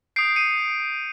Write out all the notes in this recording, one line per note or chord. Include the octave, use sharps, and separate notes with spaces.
D#6 G6 C7 D7
C#7 D#7